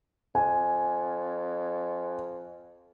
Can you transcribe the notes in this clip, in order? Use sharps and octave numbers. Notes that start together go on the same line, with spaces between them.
F2 G#5